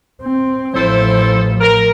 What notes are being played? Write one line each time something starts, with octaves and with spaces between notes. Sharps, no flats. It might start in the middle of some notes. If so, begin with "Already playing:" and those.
C4
A1 F3 E4 A4 C5
A#4